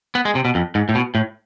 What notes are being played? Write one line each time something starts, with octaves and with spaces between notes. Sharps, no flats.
B3
G#3
C3
B2
F2
G#2
A2
B2
A2